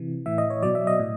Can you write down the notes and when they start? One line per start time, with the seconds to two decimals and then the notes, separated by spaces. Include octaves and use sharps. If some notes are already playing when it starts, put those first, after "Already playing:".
Already playing: C3 E3
0.26 A2 E3 E5
0.38 D#5
0.50 C#5
0.62 B2 F#3 D5
0.75 E5
0.87 D#5
1.00 A2